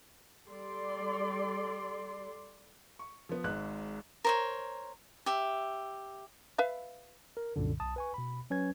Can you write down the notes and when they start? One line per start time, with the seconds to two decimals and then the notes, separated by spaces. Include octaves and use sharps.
0.49 G3 A4 D5 C6
2.99 C#6
3.29 F3 B3
3.44 G#1 G#2 F#6
4.25 A#4 C5 C#5
5.26 G4 E5
6.58 B4 E5 F5
7.37 A#4
7.56 C2 F#2 A#2 D3
7.80 B1 A5 D#6
7.96 B4 G#5 C#6
8.14 B2 B5
8.50 F#3 C#4 B4 G#6